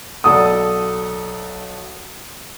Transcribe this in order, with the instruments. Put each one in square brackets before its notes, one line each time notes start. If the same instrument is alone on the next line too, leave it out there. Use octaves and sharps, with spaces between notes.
[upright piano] B1 A4 D5 F#5 D#6